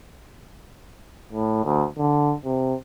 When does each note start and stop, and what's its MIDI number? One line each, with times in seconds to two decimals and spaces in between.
1.32 1.64 45
1.65 1.85 38
1.98 2.34 50
2.45 2.74 48